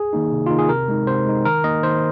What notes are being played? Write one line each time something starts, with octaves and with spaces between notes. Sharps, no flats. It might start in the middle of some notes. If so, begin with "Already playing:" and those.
Already playing: G#4
D#3 A#3 D#4
C3
D#3 A#3 D#4 F4
G#4
C3 A#4
G#3 D#4
C3 C5
G#3 D#4
D#3 A#4
A#3 D#4 D#5
D#3 C5